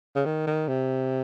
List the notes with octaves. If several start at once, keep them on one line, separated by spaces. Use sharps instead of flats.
C#3
D#3
D#3
C3